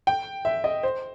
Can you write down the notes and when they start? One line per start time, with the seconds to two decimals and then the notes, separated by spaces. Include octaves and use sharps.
0.07 G5
0.45 E5
0.64 D#5
0.83 C5